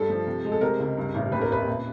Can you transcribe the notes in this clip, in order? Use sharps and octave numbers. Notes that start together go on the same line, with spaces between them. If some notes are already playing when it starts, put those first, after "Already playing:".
Already playing: G2 G3 A4
F3
C3
G#3
A4
C3 A#4
C#2
G2
A1
D#2 B4
A#4
F1 B4
A#2